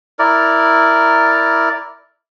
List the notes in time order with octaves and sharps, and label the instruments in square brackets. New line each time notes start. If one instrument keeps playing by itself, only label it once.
[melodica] E4 A#4 D5